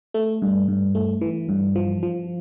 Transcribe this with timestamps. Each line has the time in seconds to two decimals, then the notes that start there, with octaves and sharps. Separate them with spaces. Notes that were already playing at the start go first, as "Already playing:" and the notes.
0.14 A3
0.42 G2
0.68 G2
0.95 A3
1.21 E3
1.49 G2
1.76 F3
2.03 F3